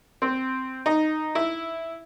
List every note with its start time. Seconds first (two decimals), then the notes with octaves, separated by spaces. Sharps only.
0.22 C4
0.86 D#4
1.35 E4